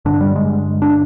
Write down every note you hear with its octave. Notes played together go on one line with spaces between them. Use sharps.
G2 D3 D4
G3
G#3
D4